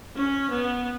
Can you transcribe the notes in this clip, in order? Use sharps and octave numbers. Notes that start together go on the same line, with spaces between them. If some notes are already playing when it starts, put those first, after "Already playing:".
C#4
B3